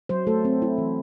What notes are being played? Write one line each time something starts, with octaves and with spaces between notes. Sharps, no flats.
F#3 C5
A3 A4
C4
E4
E3